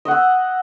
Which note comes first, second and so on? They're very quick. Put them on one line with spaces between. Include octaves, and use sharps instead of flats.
D#5 F#5 E6